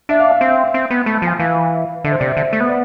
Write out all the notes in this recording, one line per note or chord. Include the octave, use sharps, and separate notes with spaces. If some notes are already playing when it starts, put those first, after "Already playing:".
D4 E5
F5
E5
C4 E5
C4
B3
A3 B5
A5
F3 G#5
E3 F5
D3 E5
C5
C3 D5
E5
D3
A3
B3
D5